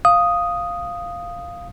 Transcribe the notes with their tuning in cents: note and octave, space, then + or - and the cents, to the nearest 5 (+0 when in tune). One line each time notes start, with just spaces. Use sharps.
F5 +0 D#6 +0